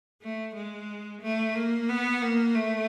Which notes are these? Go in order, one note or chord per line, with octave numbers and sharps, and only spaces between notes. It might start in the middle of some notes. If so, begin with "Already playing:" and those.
A3
G#3
A3
A#3
B3
A#3
A3